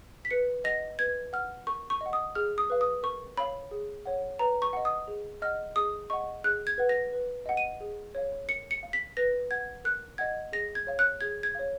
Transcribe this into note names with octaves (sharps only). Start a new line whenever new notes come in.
B6
B4 C#7
D#5 F#5 A#6
B4 G#6
F#5 F6
A#4 C#6
C#6
D#5
F#5
D#6
G#4 F6
D#6
B4 F5
D#6
A#4 C#6
C#5 F5 B5
G#4
C#5 F#5
B4 A#5
C#6
D#5 F#5
D#6
G#4
D#5 F#5 F6
G#4 D#6
D#5 F#5 C#6
G#4 F#6
G#6
B4 F#5
A#6
B4
D#5 F#5
D#7
G#4
C#5 F5
A#4 C#7
C#7
F5
B6
B4 A#6
F#5 G#6
A#4 F#6
D#5 F#5 G#6
G#4 A#6
G#6
C#5 F5
F#6
G#4 G#6
G#6
C#5 F5